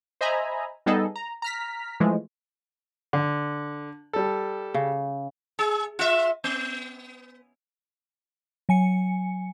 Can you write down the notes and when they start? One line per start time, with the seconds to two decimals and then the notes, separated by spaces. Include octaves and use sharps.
0.21 C5 D#5 E5 G#5 A#5 B5
0.86 G3 B3 D#4 G#4 A4 D#5
1.16 A#5
1.42 A#5 F6 B6
2.00 E3 F3 G#3 A3
3.13 D3
4.13 G3 A4
4.74 C#3
5.59 G#4
5.99 F4 E5
6.44 B3
8.69 F#3 G#5 C#7